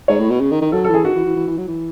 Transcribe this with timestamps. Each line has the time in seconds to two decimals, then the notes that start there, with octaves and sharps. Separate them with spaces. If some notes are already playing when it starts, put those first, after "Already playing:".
0.08 G#2 C#5
0.19 A2
0.30 B2
0.41 C#3
0.51 D#3
0.61 D#3
0.72 F#3 A4
0.84 A4
0.89 E3
0.94 G#4
1.04 D#3 F#4
1.15 E3
1.26 E3
1.36 E3
1.47 E3
1.58 F#3
1.68 E3